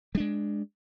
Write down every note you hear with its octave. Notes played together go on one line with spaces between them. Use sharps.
G3 G#3 D4